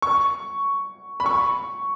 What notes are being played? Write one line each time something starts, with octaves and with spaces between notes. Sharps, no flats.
C#6
B5
C#6